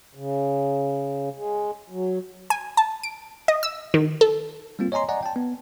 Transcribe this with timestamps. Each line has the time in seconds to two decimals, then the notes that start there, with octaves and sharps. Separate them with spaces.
0.15 C#3
1.34 G#3
1.90 F#3
2.50 G#5
2.77 A5
3.03 D7
3.48 D#5
3.63 E6
3.94 D#3
4.21 A4
4.79 G3 A#3 C4 F4
4.92 C#5 D#5 G#5 A#5 C6
5.09 D5 D#5 F#5 G#5 A#5
5.23 G5 A5
5.36 B3